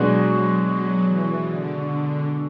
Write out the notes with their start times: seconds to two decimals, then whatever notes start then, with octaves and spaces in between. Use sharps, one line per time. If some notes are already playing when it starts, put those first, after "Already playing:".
Already playing: B2 F#3 G#3 D4 F#4
0.64 F#3
1.07 E3
1.49 D3